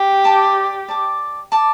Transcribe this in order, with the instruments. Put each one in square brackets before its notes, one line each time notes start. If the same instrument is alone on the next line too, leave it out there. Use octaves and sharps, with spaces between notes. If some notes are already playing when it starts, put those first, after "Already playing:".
Already playing: [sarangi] G4
[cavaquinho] D5 A5 D6
D5 A5 D6
D5 A5 D6